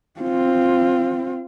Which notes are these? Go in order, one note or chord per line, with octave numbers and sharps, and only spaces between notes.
C4 F4